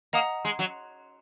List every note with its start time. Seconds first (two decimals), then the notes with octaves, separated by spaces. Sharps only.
0.13 A#3 D#5 F#5 A#5 D#6
0.45 G#3
0.59 F#3